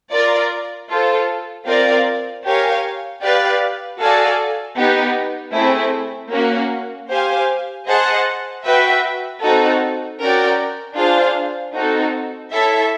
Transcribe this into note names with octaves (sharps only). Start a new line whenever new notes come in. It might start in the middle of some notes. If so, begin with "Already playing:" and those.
F4 A#4 D5
F4 A4 C5
C4 F4 A#4 D5 F5
G4 A#4 C#5 F5 G#5
G4 B4 D5 F5
F#4 A4 D5 F5 G#5
B3 D#4 G4
A3 C4 E4 G#4
A#3 C#4 F#4
G4 C5 F5 G#5
G#4 C5 D#5 F#5 A5
F#4 B4 E5 G5
C4 D#4 F#4 A4
C#4 F#4 A#4 D5 G5
D4 F4 G#4 C5 F5
C4 D#4 F#4 A4
E4 A4 C#5 E5